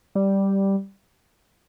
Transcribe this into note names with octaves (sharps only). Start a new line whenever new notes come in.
G3